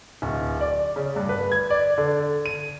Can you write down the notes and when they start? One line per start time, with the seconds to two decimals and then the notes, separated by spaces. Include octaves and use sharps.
0.22 D1
0.61 D5
0.96 C#3
1.16 G2
1.29 B4
1.52 G#6
1.70 D5
1.98 D3
2.46 D#7